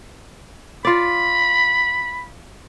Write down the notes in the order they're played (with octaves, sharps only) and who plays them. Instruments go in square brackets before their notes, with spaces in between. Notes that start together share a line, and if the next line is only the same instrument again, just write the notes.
[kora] F4 D5 [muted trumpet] B5